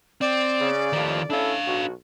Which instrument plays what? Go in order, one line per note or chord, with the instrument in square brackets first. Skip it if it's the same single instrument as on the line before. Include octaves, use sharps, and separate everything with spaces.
[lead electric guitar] C4 [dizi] D5
[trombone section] C#3
[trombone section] F2 A2 F3 [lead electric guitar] D#3 G4
[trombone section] C#4 E4 A4 [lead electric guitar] D4 F5
[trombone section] B1 F#4